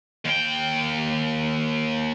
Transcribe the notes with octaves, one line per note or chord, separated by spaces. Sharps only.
D#2 G5